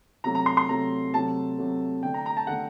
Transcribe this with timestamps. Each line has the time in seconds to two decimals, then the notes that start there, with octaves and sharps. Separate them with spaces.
0.24 C3 F#3 A3 A#5
0.35 A#5
0.46 C6
0.57 C6
0.69 C3 F#3 A3 A#5
1.14 C3 F#3 A3 A5
1.58 C3 F#3 A3
2.03 D3 A3 G5
2.14 A#5
2.26 A#5
2.37 A5
2.47 D3 A3 F#5